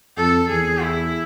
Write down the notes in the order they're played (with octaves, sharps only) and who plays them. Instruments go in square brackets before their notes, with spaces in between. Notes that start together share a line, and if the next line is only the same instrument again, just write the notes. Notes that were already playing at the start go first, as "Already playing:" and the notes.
[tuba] F2 [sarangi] A4
[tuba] E2 [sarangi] G#4
[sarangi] E4